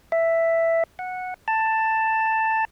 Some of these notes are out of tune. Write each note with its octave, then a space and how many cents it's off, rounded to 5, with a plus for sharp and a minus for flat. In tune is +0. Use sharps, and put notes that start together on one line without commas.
E5 +5
F#5 -10
A5 +10